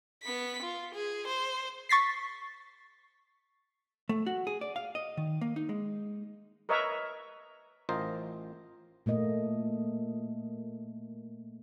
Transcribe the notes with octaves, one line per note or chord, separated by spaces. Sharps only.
B3 B6
F4
G#4
C5
C#6 A6 B6 C7
A3
F#4
G#4
D5
F5
D#5
D#3
A#3
D#4
G#3
A#4 B4 C#5 D#5 E5 A#5
A1 F4 A#4 C5 D#5
A#2 A3 A#3 D#5